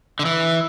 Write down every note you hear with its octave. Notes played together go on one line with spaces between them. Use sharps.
D3
E3